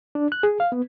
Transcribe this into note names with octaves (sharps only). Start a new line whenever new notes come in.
D4
F#6
G#4
F5
B3